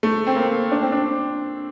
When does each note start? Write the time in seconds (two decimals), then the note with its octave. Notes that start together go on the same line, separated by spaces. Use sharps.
0.03 A3
0.27 C4
0.36 A#3
0.72 D4
0.82 C4
0.92 D4